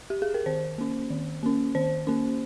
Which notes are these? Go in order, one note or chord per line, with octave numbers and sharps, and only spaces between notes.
G4
G#4
A#4
D#3 C5
A#3 C#4
D#3
A#3 C#4
D#3 C5
A#3 C#4